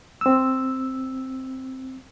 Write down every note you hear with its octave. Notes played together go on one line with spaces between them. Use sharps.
C4 E6